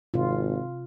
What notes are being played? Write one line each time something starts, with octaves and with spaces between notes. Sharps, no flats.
G#1 C3 F4